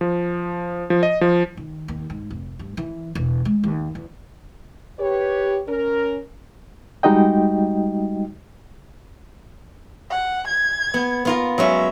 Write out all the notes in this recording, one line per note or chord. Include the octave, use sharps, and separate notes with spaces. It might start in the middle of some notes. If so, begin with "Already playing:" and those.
F3
F3
D#5
F3
D#3
D#2
G#2
F1
G2
E3
E1
G#3
D#2
E2
G4 B4 C#5
C#4 A#4
G3 G#3 D#4 F#4 D#5 G5
F#5
G#6
B3
B3 F4 A#4
F#3 G#3 C#4 E5